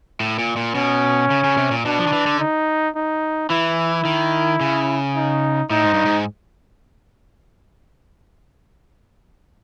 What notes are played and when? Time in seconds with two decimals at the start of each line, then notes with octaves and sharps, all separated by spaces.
0.20 A2
0.39 A#2
0.56 A#2
0.74 B2 C#4
1.30 C#3
1.44 C#3
1.57 C3
1.71 A#2
1.85 B2 D4
1.99 F3
2.07 D#3
2.13 E3
2.26 D3
2.40 D#4
2.95 D#4
3.50 E3 E4
4.05 D#3
4.61 C#3
5.16 D#4
5.70 A2 D#4
5.82 G#2
5.94 G2
6.05 G#2